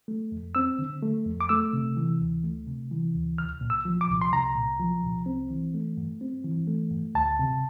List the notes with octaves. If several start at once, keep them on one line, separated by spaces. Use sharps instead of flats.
A3
F2
C4 E6
D3
A3
F2
D6
A3 E6
C3
E3
D2
A3
C3
E3
D2
C2 F6
A#2
E6
F3
D6
C2
C6
C2 A#5
A#2
F3
C2
C4
E3
A3
G2
C4
E3
A3
G2
D2 A5
C3